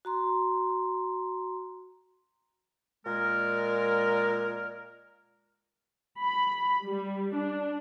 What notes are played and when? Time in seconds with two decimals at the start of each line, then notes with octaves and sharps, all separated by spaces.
0.05 F#4 A#5 C6
3.06 A#2 G#3 A#4
6.21 B5
6.84 G3
7.35 D4